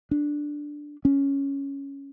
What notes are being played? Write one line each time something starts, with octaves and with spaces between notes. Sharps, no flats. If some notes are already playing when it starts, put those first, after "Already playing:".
D4
C#4